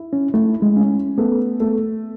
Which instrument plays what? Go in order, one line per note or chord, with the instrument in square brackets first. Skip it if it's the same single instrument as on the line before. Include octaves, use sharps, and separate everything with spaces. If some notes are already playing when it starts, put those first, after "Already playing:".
Already playing: [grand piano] E4
[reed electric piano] C#4
[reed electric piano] A3 [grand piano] E4
[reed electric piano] G#3
[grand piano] C#4
[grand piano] A3 [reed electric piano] B3
[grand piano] A3